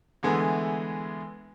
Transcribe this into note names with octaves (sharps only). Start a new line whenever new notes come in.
E2 D3 E3 G#3 A3 B3